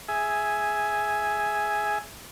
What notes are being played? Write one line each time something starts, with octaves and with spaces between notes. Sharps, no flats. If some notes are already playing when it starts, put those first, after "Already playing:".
G#4 E5 G#5